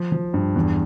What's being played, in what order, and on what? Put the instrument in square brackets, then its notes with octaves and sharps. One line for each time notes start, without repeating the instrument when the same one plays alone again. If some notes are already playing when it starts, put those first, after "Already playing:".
Already playing: [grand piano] F3
F3
G2
E2